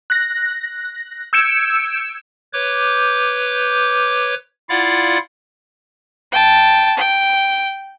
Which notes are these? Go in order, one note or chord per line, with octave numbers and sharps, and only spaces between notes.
F#6 A#6
E6 G6 G#6 C#7 D7 E7
B4 C#5 D6 G6
E4 F4 D5 F5 F#5
G5 A5
G5